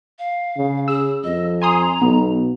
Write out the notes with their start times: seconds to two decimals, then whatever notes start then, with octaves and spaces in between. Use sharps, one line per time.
0.19 F5
0.58 C#3
0.88 G#4 E6
1.24 F2 D#5
1.62 G#5 A#5 C6 D#6
2.02 B1 B3